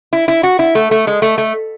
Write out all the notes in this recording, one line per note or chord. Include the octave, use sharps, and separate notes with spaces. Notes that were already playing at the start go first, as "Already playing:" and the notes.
E4
E4
F#4
E4
A3
A3
G#3
A3
A3